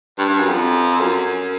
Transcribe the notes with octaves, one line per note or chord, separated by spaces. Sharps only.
G2
G2
F#2
F2
F#2